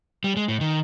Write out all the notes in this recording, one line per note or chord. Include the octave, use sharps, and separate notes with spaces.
G3
G#3
A2
D#3